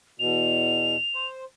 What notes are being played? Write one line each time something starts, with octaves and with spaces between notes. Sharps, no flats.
E2 B2 F7
C5